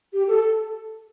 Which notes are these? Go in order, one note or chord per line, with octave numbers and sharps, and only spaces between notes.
G4
A4